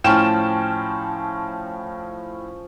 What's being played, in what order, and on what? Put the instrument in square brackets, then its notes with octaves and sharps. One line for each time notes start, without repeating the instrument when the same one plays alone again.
[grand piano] A2 G5 E7 [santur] F3 C#4 A5